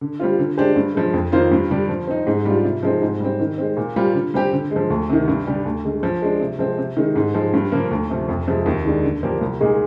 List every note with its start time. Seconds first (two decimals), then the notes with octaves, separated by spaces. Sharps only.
0.01 D3
0.20 G3 C4 F4
0.39 D3
0.57 G#3 D4 G4 C5
0.76 G2
0.95 F3 G#3
1.13 F2
1.32 D#3 A#3 F4 C5
1.51 G2
1.70 D3 G3 D4
1.89 F3
2.07 C4 D#4
2.27 G#2
2.45 G3 D4 F4
2.64 C3
2.83 F3 G#3 C4 D#4
3.02 G#2
3.20 G3 C4
3.40 D#3
3.58 G#3 C4
3.77 A#2
3.96 G3 C4 F4
4.15 D3
4.34 G3 C4 G4
4.53 D3
4.71 G#3
4.76 F3
4.90 D2
5.09 C3 D#3
5.28 G2
5.47 D3 G3 D4 G4
5.65 D2
5.85 D3 G#3
6.03 F3
6.22 G#3 D4
6.40 C3
6.59 F3 G#3 C4
6.78 C3
6.97 D#3 G#3 D#4
7.15 G#2
7.34 F3 G#3
7.54 G2
7.72 D3 F3 A#3
7.91 D2
8.10 C3 F3
8.28 F2
8.47 C3 F3 G#3
8.66 D#2
8.85 D#3 G#3 D4
9.04 D3
9.23 F3 A#3 D4 G4
9.41 C2
9.61 A#2 G#3 D#4 G#4